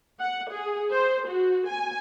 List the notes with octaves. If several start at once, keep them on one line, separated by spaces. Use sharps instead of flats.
F#5
G#4
C5
F#4
G#5